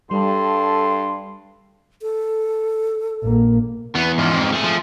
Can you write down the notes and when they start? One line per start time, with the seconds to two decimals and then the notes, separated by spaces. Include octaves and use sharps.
0.11 G2 G3 A4 C6
2.02 A4
3.22 A#1 A#3
3.95 E2 B3
4.18 G#2 F3
4.33 F2
4.52 A3 G#4
4.64 F3